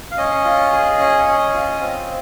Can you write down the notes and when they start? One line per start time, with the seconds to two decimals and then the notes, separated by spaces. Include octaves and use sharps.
0.11 F5
0.17 C#4 D#5
0.45 F4
0.72 G#4
0.99 C#4
1.27 C#4
1.54 F4
1.80 C4